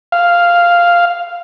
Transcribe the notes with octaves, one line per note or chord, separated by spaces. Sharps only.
F5